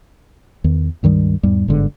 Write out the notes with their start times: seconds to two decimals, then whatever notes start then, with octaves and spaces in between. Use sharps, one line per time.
0.64 E2 D#3
1.03 C#2 G2 D#3 G3
1.43 E2 G#2 G3
1.68 G1 G#2 D3